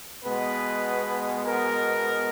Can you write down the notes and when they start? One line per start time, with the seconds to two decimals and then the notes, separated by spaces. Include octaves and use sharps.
0.23 B2 G#3 B3 B4
1.46 A#4